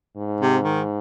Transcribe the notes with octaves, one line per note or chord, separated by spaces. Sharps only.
G#2
C3
D#3